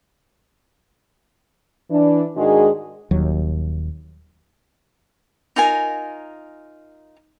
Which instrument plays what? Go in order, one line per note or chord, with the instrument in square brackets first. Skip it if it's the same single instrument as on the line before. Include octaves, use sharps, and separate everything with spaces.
[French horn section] E3 D4
G#2 D#3 G#3 D4 F#4 G#4
[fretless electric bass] D#1 D#2 F#3
[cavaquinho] D#4 F4 A#4 G#5